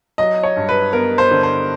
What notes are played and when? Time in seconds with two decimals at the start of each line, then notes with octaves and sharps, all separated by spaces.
0.18 F#3 D#5
0.43 C#5
0.56 G2
0.69 B4
0.93 B3 A#4
1.18 C5
1.31 D3
1.43 C5